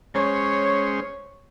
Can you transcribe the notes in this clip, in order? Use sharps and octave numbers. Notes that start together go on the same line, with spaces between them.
G#3 C#4 C5 C#5